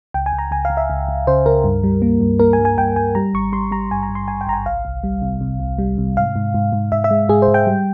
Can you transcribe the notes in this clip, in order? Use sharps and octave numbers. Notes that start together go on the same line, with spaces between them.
C#2 G5
G#5
C#2
A#5
C#2 G#5
F5
C#2
E5
C#2
C#2
C#3 C5
C#2 A#4
G2
G3
A#3
G2
A#3 A#4
G#5
G2
G#5
G2 G5
G2 G#5
G3 A#5
G#1 C#6
G3 C6
G3 A#5
G2 G#5
A#5
G2
C6
G#1 G#5
G5
G#1 A#5
G#5
C2 F5
C2
G3
C3
C3
C2
G3
C3
G#2 F5
G#2
G#2
G#2
G#2 E5
E5
G#3
G#2 G#4
C5
G#2
G5
G3